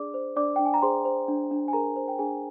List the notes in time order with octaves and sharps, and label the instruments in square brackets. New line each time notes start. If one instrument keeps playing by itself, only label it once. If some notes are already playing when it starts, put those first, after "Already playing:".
Already playing: [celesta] D4 G#4 D5 D6
C5
D4 D5 D6
D4 G5
G#5
A#5
G#4 C5 C6
C5
D4
D4
G#5
G#4 A#4 A#5
C5
G5
D4 G#4 G#5